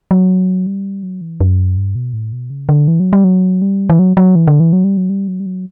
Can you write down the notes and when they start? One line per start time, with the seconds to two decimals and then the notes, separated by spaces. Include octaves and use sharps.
0.11 F#3
0.67 G3
1.03 F#3
1.21 E3
1.41 F#2
1.77 G2
1.95 B2
2.13 A2
2.32 B2
2.50 C#3
2.69 D3
2.88 E3
3.00 F#3
3.13 G3
3.24 F#3
3.62 G3
3.90 E3
3.99 F#3
4.17 F#3
4.35 E3
4.47 D3
4.60 E3
4.73 F#3
4.84 G3
4.97 F#3
5.10 G3
5.28 F#3
5.40 G3
5.46 F#3